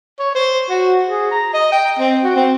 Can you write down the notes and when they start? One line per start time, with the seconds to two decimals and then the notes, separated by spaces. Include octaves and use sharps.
0.19 C#5
0.35 C5
0.69 F#4
1.07 G#4
1.31 A#5
1.54 D#5
1.72 G5
1.99 C4
2.24 F#4
2.36 C4